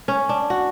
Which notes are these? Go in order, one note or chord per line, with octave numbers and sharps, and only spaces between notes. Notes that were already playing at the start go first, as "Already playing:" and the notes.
C#4
D4
F#4